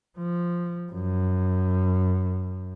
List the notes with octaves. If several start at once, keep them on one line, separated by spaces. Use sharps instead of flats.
F3
F#2